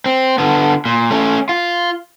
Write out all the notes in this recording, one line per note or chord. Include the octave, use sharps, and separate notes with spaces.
C4
D3 B3
A#2
A3 C#4
F4